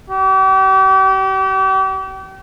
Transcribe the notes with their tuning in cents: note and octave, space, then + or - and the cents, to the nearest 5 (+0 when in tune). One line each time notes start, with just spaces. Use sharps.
G4 -40